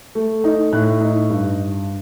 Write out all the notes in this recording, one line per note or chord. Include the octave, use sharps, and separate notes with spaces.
A3
D#4
A2 F#6
D#4
G2